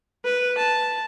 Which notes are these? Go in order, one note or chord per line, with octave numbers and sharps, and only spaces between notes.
B4
A5